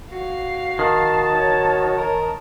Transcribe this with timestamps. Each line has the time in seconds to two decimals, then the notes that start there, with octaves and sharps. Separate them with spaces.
0.12 F#4 F5 C7
0.79 D#3 A5
1.31 C#5
1.98 A#4